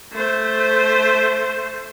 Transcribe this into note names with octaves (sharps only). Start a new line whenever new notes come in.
A3 C5